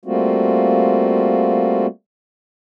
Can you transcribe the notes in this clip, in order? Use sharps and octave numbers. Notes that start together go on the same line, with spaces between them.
G3 A3 A#3 C4 F4 F#4